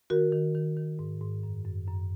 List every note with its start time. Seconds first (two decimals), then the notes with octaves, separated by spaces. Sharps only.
0.10 D#3 F#4 A#4
0.32 D#3
0.55 D#3
0.77 D#3
0.99 G#2
1.21 G#2
1.43 F#2
1.65 F#2
1.87 F#2